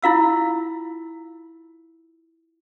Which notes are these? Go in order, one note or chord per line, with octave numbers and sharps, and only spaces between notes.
E4 F4 F5 E6